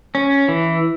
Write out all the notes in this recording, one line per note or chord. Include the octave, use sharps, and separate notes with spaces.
C#4
E3